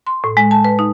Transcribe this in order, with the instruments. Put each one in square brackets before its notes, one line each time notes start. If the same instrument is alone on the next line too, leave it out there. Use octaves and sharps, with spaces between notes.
[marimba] C6
A2
G#3
A5
B4
D#4